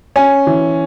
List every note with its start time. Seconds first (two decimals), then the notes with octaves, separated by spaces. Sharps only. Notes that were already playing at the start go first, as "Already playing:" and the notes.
0.16 C#4 G#5
0.47 E3